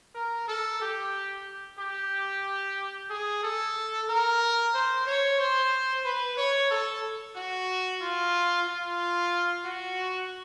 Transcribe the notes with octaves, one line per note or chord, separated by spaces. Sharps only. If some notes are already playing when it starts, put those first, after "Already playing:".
A#4
A4
G4
G4
G#4
A4
A#4
C5
C#5
C5
B4
C#5
A4
F#4
F4
F4
F#4